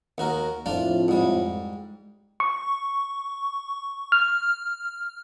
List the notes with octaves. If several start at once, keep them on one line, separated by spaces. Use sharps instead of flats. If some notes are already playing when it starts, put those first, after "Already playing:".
D#2 F#4 A#4
F2 A2 D4 F4 D5
G#2 G3
C#6
F6